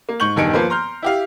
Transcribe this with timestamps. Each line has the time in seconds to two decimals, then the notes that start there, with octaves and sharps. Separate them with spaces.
0.09 A#3
0.20 G#2 C#6 G6 F#7
0.36 E1 G2 D#3 G#5 C#7 D7
0.53 F3 A#3 B4 C5
0.70 A#5 C6 F6 G6
1.02 E4 G4 F5